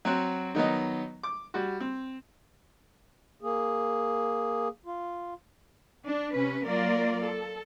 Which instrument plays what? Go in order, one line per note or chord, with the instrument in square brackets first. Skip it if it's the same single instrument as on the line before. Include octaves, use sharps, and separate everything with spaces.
[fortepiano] F#3 C4 F#4
D#3 F#3 B3 D#4
D6
G3 F#4
C4
[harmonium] A#3 G#4
F4
[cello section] D4
C3 C#4 B4
F#3 A#3 F4 A#4 D5
A4